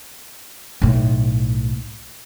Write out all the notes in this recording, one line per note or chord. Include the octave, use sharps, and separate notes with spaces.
B1 A2